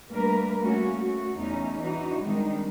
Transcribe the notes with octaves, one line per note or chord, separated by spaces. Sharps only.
G3 A3 A#3 D4 A#4 B4
G3 A3 A#3 C#4 F#4
A3 F#4
E2 A3 C#4 D#4
E3 D4 D#4 F#4
D#3 G3 G#3 C4 D4 D#4